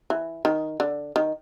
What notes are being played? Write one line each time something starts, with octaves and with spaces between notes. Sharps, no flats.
E3
D#3
D3
D#3